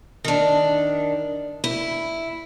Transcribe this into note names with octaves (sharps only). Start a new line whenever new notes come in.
D#3 D4
E4